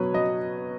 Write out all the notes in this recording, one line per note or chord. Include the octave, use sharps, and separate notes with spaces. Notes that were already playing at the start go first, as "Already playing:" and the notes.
Already playing: B2 F#3 B4 C#5
F#3 D#5